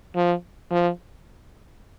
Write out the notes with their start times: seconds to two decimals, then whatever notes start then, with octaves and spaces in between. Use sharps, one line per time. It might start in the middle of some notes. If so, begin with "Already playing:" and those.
0.16 F3
0.71 F3